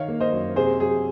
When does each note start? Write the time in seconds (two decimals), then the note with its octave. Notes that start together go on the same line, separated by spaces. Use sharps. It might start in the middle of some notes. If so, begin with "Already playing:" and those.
Already playing: D#3 C#5 F5
0.08 A#3
0.21 C5 D#5
0.33 F#2
0.56 C3 G#4 C5
0.80 F#3 G#4